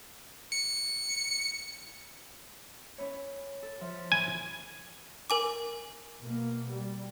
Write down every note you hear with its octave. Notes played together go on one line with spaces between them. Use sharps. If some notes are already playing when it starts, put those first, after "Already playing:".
C#7
C#4 E4 C#5
A4
F3 E5
E3 G#5
A#4 G#5 D6
B2 A#3
G3